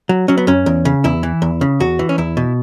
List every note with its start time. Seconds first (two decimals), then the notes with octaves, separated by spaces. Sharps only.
0.09 F#3
0.28 F#3 C#4
0.38 B3
0.47 F#2 C#4
0.66 E2
0.85 C#3
1.04 E2 E4
1.23 E3
1.42 E2
1.61 C#3
1.80 E2 F#4
1.99 E3
2.09 C#4
2.18 E2 E4
2.37 B2